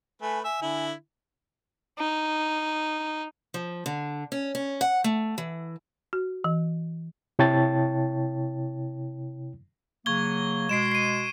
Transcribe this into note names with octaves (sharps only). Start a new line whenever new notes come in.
A3 B4 G#5
E5 G#5
D3 E4
D#4
F3
D3
C#4
C#4
F#5
A3
E3
F#4
E3
C3 E4 C#5 G5 A5 A6
C#3 F#3 A#3 C#6 G#6 G7
B2 G#3 C7 D7 E7
C7 D#7